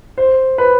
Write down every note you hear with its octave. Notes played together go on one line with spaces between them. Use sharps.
C5
B4